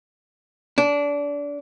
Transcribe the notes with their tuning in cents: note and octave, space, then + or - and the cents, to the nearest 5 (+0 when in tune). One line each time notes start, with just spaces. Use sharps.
D4 -25